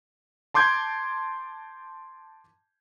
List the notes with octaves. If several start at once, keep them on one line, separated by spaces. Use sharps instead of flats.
A5 C6 D6 G6 G#6